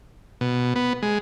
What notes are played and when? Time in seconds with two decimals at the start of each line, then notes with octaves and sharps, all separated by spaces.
0.41 B2
0.76 B3
1.02 G#3